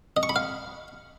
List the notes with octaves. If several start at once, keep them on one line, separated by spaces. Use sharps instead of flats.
D#5
C#6
B5
F5